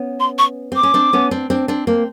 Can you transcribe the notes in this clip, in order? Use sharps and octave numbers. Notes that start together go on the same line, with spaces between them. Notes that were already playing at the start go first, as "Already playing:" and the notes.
Already playing: B3 C#4
C6
C#6
C4 D6
C#4
C4 D4
B3 C#4
C4 D4
C4 D4
C4 D4
A#3 C4